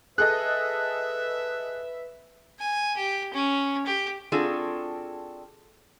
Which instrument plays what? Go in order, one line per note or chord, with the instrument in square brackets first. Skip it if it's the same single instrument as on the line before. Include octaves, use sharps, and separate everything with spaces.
[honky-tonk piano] G#4 A4 D#5 [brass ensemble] B4 E5 [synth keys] F#6
[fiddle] G#5
G4
C#4
G4
[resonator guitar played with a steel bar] C4 D4 F4 F#4 G#4 A4